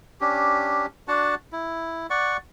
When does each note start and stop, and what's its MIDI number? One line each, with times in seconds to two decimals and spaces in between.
0.21 0.86 61
0.21 0.86 62
0.21 0.86 67
1.08 1.35 62
1.08 1.35 66
1.08 1.35 78
1.08 1.35 81
1.53 2.07 64
2.10 2.37 74
2.10 2.37 78
2.10 2.37 85